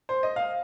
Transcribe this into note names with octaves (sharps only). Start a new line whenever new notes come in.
C5
D#5
F5